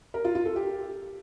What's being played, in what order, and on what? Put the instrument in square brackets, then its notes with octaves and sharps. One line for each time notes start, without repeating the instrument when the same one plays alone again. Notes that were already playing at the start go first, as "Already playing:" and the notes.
[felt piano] A#4
F4
F4
A4
G4